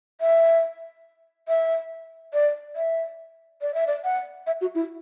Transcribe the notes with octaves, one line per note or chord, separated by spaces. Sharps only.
E5
E5
D5
E5
D5
E5
D5
F#5
E5
F#4
E4